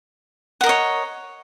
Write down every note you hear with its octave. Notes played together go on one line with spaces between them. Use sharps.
A#4 C#5 D#5 F#5